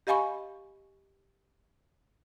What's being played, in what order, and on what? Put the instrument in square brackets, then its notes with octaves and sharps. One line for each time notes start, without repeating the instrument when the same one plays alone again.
[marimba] G4 D#5 F5 G#5 B5 C#6